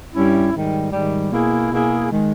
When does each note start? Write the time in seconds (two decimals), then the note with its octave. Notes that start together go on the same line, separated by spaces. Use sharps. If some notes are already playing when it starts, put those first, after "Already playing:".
0.13 G2 G3 C#4 E4
0.53 G#2 D#3 G3
0.92 G#2 D#3 G3
1.31 B2 A#3 E4 G#4
1.70 B2 A#3 E4 G#4
2.10 D#3 G#3